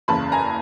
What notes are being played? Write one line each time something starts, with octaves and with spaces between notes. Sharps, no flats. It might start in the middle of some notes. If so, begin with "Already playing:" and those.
F#1 E2 C#3 A5 B5
G#5 A#5